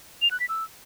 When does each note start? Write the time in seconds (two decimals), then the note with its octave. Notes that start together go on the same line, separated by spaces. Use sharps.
0.22 F7
0.31 F#6
0.40 B6
0.49 E6